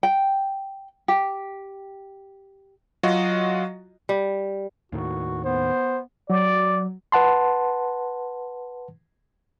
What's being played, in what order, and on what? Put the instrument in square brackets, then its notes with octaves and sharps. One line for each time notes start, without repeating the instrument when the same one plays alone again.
[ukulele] G5
G4
[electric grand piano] F#3 F4 F#4 D#5
[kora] G3
[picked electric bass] D#2 A2 D#3 [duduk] F#4
[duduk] B3 [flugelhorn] C5
[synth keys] F#3 [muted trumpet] D5
[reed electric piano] B4 F#5 A5 C6